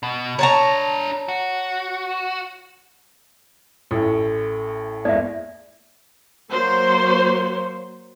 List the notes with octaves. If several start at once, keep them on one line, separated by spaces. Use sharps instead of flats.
B2
D4 A#4 C#5 A5 A#5
F#4
A1 A2
G#1 E2 D5 E5
F#3 A#3 C5 C#5